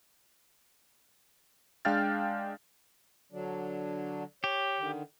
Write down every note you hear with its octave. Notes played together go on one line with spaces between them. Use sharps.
G#3 D4 F5 G5 F6 A6
D3 F#3 D4
G4 C#5
D3 D#3